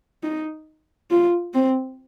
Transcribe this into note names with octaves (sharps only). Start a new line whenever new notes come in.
D#4
F4
C4